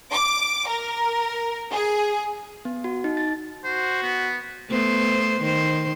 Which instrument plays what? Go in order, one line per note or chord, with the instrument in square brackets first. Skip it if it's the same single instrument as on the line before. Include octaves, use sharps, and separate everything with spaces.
[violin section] D6
A#4
G#4
[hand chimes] B3
F#4
D#4
A6
[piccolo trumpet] F#4 [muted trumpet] C5
[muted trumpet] B3
[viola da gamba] A3 B3 C5
D#3 C5